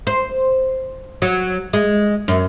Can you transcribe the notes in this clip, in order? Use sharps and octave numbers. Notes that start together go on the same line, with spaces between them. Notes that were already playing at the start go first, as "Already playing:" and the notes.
C5
F#3
G#3
F#2